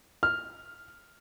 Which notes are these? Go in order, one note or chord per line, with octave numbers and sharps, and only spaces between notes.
F6